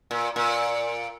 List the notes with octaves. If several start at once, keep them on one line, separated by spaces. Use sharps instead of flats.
A#2
A#2